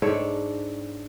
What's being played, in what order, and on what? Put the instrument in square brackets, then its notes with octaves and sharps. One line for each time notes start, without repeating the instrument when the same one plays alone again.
[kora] G#2 D4 A4 C#5